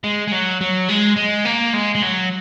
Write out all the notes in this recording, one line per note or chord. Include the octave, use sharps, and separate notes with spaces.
G#3
G#3
F#3
F#3
G#3
G#3
A#3
G#3
G#3
F#3